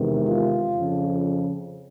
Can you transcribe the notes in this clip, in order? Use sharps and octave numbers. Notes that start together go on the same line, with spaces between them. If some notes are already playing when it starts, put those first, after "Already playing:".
Already playing: E2 C3 D#3 G#3
F4
F2 C#3 F3